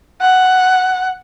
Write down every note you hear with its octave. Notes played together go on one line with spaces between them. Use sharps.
F#5